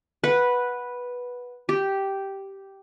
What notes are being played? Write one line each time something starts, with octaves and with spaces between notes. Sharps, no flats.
B4 F#5
G4